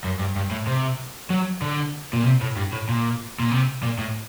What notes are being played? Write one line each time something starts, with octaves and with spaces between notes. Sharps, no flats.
F#2
G2
G2
A2
C3
F#3
D3
A#2
C3
A2
G2
A2
A#2
A#2
C3
A#2
A2